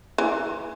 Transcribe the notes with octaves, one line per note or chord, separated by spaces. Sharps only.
E3